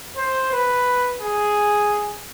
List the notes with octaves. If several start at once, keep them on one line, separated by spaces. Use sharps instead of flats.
C5
B4
G#4